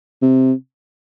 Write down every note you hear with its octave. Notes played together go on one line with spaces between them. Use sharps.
C3